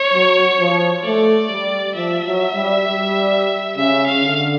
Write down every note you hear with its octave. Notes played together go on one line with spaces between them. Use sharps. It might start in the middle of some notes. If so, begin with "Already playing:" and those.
Already playing: C#5
F#3
F3
A3 D5
G3
F3 E5
F#3
G3
G3
C#3 E5
F5
D3